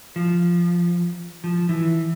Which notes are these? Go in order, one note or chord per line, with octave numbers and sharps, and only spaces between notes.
F3
F3
E3